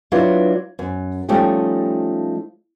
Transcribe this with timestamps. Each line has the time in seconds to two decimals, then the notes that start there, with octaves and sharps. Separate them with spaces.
0.12 F#3 D4 E4 F4 B4
0.79 F#2
1.29 F3 G3 A3 C#4 D#4 G4